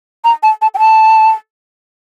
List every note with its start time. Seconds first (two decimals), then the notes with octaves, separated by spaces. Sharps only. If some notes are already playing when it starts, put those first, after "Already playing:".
0.25 A#5
0.43 A5
0.62 A5
0.74 G5
0.79 A5